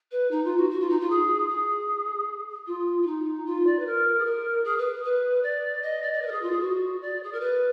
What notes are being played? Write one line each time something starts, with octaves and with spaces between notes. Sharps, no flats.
B4
D#4
F4
F#4
F#4
F4
D#4
F4
G#4
G#4
F4
F4
D#4
F4
D5
B4
A#4
G#4
A#4
G#4
B4
B4
D5
D#5
D5
D5
B4
A#4
G#4
F4
G#4
F#4
D5
G#4
A#4
B4